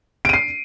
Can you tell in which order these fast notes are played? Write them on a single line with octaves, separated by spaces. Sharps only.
D7 D#7 C7